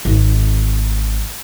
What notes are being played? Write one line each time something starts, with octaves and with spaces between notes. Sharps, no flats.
G#1